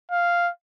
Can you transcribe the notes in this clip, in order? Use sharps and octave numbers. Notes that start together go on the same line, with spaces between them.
F5